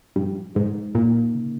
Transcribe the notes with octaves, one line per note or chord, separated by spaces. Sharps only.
G2 F3
G#2 D#4
A#2 A#3
C#3